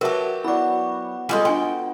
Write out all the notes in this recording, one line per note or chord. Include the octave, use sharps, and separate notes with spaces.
F#3 F#4 G4 A#4 B4 E5 A5
B3 E4 F#4 D5 B5 D6
G3 G#3 F4 A4 G#5 C6
D4 G5 G#5 C6